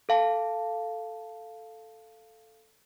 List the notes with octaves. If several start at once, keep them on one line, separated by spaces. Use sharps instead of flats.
A4 F5 A5